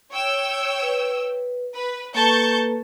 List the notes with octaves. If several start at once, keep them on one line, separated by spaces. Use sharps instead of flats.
C#5 G5 E6
B4
B4
A#3 A4 B4 A5 C#6 G6